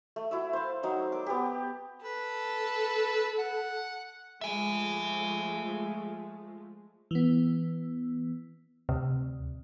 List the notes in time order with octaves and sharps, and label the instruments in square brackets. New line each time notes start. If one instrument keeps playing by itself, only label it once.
[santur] A3
E4 F#4 E5
C5 F5
F#3 D#4 C5
A#4 D6
B3 G4
[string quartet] A4 [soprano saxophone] B4
[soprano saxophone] F#5
[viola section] F3 G#3 A3 [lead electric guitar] E5 G#5
[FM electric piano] E3 B3
[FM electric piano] D2 [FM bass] C3